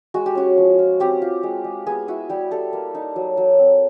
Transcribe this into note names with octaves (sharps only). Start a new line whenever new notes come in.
G#3 F#4
G4
C#4 F#4
F3
F4
C4 G4
F4
G#3
G#3
B3 G#4
E4 F#4
G3 G4
G3 A4
A#3
D#4
F#3
F#3
C4